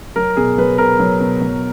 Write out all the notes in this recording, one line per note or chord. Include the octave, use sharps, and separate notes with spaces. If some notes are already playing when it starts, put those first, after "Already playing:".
F#3 A#4
B2 G#4
F#3 B4
B2 A#4
F#3
B2
F#3